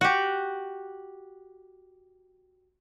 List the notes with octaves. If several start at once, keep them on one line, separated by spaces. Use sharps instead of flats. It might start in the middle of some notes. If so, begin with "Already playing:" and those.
F#4 G4